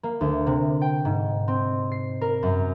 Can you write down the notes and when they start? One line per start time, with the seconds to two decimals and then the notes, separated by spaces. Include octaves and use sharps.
0.03 A#3
0.21 D2
0.46 C3
0.82 G5
1.05 G#2
1.48 C4
1.92 C7
2.21 A#4
2.43 F#2